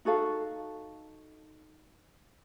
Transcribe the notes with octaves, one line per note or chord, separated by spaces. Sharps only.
D#4 F#4 A4 F5